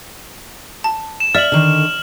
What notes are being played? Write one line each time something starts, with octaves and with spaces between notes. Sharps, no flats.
A5
E7
D5 E5 F6 F#7
D3 D#3